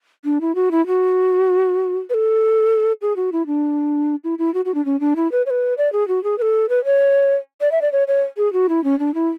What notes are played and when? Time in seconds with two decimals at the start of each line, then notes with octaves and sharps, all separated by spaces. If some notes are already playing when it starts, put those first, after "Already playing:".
0.25 D4
0.41 E4
0.55 F#4
0.71 E4
0.87 F#4
2.10 B4
2.14 A4
3.02 G#4
3.16 F#4
3.32 E4
3.46 D4
4.24 E4
4.39 E4
4.54 F#4
4.65 F#4
4.74 D4
4.85 C#4
5.00 D4
5.16 E4
5.32 B4
5.46 C#5
5.50 B4
5.78 D5
5.92 G#4
6.08 F#4
6.24 G#4
6.38 B4
6.42 A4
6.69 B4
6.85 C#5
7.61 D5
7.72 E5
7.82 D5
7.92 C#5
8.08 C#5
8.37 G#4
8.53 F#4
8.69 E4
8.84 C#4
8.99 D4
9.14 E4